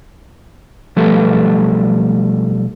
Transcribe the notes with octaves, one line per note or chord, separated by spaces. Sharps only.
B1 F3 G3 A3 A4 B4